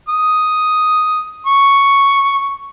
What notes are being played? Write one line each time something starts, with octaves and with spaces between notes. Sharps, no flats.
D#6
C#6